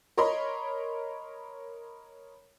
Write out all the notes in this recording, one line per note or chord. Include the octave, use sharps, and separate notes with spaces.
A#4 C#5 D#5 B5 C6